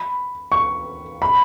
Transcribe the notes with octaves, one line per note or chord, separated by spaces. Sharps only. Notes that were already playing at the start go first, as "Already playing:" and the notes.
Already playing: B5
C#6
B5